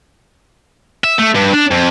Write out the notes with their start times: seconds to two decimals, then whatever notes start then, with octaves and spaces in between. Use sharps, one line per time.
1.04 E5
1.19 A3
1.35 G2
1.54 D4
1.71 F2